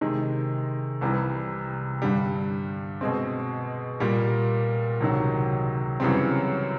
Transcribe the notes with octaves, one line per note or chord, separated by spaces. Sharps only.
C3 D#3 G#3
C2 C3 E3 G3
G2 D3 G3
B2 G#3 C4
A#2 G3 A#3
C#2 C3 D#3 F#3
F#2 C#3 E3 G3 C4